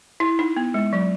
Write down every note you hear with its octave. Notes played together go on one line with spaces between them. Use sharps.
E4
D#4
B3
G#3
F#3